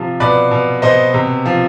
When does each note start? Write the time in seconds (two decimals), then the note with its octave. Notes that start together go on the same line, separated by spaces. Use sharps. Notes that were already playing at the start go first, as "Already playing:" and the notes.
Already playing: C3 F3
0.20 B2 B4 D5
0.51 B2
0.82 B2 C5 D#5
1.14 C3
1.46 F3